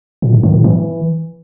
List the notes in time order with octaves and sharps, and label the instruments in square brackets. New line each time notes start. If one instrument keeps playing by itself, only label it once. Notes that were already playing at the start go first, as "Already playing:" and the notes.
[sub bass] A#2
G#2
D#3
A2
E3